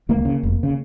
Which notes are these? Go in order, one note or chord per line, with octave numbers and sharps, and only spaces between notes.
C#2 A#3
C#3
F1
C#3